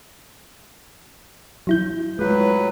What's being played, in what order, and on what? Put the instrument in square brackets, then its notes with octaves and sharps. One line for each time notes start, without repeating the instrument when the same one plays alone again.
[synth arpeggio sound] F#3 E4 G6
[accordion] A2 F#3 B4 [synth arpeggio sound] G#3 F4